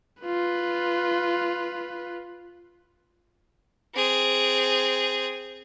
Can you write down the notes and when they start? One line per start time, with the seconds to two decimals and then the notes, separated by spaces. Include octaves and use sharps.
0.23 F4 B4
3.95 C4 G#4